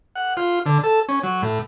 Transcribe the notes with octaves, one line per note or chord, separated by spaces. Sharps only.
F#5
F4
D3
A4
C#4
F#3
A2